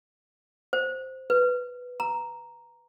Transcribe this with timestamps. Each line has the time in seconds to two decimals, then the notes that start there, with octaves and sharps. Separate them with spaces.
0.73 C5
1.30 B4
2.00 A#5